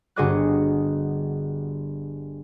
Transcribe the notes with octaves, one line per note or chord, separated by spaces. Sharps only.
G1 F#4 G#4 D#5 D6 F#6